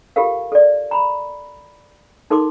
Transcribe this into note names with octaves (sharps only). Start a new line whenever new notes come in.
F4 G4 A4 A#4 F5
A4 D5
A#5 B5
D#4 A4 A#4 C6 D6